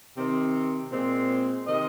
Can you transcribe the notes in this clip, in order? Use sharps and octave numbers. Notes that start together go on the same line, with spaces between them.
C3 D#3 C4
A#2 G#3 C4
C3 D#3 C4 D#5